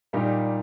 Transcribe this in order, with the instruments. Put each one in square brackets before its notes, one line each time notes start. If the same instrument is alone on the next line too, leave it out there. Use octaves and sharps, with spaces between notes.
[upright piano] A#2 G3 A#3 D#4 G4